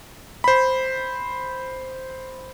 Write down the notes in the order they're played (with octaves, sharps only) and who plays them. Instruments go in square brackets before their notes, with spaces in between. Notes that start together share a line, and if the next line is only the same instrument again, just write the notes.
[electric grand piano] C5 B5